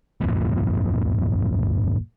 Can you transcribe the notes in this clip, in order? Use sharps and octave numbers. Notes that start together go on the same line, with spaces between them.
D1 G1 F2 A#2